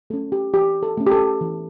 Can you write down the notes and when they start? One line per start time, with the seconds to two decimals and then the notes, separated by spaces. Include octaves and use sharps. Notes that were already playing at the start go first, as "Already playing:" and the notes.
0.10 A3 C#4 A4
0.32 G4
0.54 E3 G4
0.83 A4
0.97 A3 C#4
1.07 G4
1.12 A4
1.41 E3